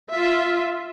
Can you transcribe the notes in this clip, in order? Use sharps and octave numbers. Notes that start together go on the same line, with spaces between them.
F4 E5